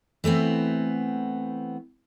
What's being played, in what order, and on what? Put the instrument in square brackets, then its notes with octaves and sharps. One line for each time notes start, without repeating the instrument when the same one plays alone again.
[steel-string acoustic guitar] E3 A3 B3 C4